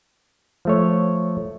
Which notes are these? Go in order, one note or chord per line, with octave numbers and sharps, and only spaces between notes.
F3 A3 C#5